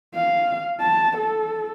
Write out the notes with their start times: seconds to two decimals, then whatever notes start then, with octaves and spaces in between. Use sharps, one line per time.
0.15 F5
0.81 A5
1.18 A4